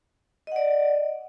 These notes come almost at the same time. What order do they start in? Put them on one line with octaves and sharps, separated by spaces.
D#5 F#5 D5